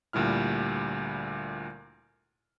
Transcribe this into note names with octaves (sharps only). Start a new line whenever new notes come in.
D2 A#2 G3 E4 F6